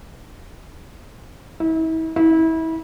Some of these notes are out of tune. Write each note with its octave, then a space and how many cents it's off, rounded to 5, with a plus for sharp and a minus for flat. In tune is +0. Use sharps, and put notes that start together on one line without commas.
E4 -40
E4 -30